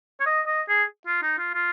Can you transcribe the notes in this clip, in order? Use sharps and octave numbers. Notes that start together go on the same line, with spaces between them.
C#5
D#5
D#5
G#4
F4
D#4
F4
F4